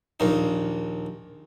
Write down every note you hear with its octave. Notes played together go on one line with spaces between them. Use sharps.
A#1 D#2 D#4